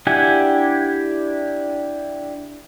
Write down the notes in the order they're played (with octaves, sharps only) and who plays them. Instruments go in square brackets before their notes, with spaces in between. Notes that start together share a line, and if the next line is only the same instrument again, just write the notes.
[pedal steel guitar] D4 E4 G4 F#5 G#5